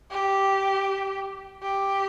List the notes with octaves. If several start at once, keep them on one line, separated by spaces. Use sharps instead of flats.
G4
G4